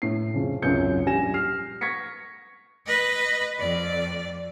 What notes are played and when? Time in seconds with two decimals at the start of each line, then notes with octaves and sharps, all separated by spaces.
0.02 A2 C7
0.34 F2 C#3
0.62 G#1 C#2 F#2 C#5 G6 C#7
1.06 A#1 F#2 G3 G#5 A#6 E7
1.34 F6 C7
1.81 C#6 G#6 A#6 B6 C#7
2.86 B4 D#5
3.59 F2 D5